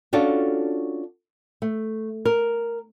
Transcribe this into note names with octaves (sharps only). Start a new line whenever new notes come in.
C#4 D4 F4 F#4 A4
A3
A#4